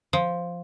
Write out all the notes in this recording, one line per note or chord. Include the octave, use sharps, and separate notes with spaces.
F3